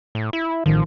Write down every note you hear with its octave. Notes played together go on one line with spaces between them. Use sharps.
A2
E4
A1 D#3 F3